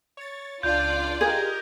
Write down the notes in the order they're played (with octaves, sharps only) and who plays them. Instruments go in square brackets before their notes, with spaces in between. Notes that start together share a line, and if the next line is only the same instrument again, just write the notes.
[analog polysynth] C#5 A6
[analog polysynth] C#2 D4 [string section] F4 D5 [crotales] G6
[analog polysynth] G4 A#4 D#5 [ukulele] G#4